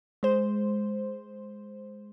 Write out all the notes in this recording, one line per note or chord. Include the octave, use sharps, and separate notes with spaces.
G#3 C5